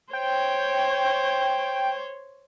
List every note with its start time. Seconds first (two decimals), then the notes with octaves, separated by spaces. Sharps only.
0.13 C5 C#5 G5